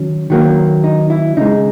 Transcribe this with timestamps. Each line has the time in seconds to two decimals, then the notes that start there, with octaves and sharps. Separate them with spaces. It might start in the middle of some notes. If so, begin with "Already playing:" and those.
Already playing: D#3 F#3 C#4
0.30 D#3 F#3 A#3
0.84 D#4
1.10 E4
1.37 C#3 G#3 D#4